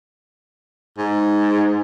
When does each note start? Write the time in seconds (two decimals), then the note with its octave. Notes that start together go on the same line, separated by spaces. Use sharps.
0.98 G#2